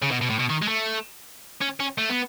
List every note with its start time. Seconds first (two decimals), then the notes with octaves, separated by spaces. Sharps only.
0.02 C#3
0.11 B2
0.21 B2
0.30 A2
0.39 B2
0.50 D#3
0.62 G#3
0.68 A3
1.62 C#4
1.80 C#4
1.98 A3
2.09 B3